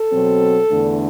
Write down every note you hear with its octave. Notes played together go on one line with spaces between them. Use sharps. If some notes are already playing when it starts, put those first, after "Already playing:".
Already playing: A4
B2 F#3 C4
E2 D3 A3 D4